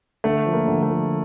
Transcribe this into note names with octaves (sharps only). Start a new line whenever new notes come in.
D3 A3
F3
A#3
D3
A3
F3